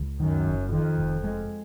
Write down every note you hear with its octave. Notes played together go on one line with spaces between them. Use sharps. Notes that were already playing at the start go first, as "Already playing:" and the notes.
Already playing: C#2
F#2 D#3
F#1
F2 D#3
F1
G#3